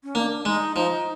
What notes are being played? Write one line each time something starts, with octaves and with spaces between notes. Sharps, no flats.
C#4
A#3 D4 D#4
G#3 D#4
F3 D#4